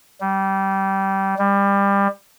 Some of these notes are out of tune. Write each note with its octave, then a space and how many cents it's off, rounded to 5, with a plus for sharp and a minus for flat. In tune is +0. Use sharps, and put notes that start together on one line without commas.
G3 -20
G3 +25